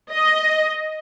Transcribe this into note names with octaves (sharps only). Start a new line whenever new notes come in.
D#5